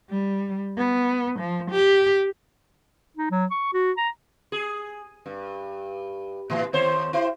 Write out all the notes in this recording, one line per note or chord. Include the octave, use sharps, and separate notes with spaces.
G3
B3
F3
G4
D#4
F#3
C#6
F#4
A#5
G#4
G2
A2 E3
D#2 C5 C#5
E4 G4 C5